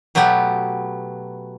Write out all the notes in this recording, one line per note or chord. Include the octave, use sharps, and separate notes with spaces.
B2 F#3 A3 B3 G4